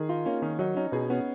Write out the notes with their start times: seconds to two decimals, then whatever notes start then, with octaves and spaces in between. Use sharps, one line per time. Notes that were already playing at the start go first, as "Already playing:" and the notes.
Already playing: D#3 G#4
0.09 D#4 F4
0.26 A#3 C#4
0.42 D#3 C#4
0.59 F#3 D#4
0.77 C#4 D#4
0.92 B2 G#4
1.10 B3 C#4